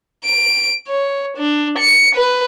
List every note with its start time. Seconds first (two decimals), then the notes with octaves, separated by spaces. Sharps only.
0.25 D7
0.88 C#5
1.37 D4
1.78 C#7
2.16 B4